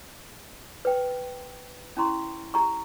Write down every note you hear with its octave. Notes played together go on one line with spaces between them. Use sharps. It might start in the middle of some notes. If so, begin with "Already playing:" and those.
B4 G5
C#4 E4 A#5 C6 C#6
G4 A#5 C#6